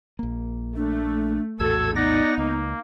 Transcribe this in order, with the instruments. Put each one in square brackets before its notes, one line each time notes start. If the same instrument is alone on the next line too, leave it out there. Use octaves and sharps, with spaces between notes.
[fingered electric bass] A#1 A#3
[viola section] A3 [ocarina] D4
[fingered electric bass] A#1 E2 A2 [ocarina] F#4 [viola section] A4 [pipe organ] E6 G#6
[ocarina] B3 [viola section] D#4 [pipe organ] D5 F#5 A#6
[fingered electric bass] C#2 [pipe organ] A#3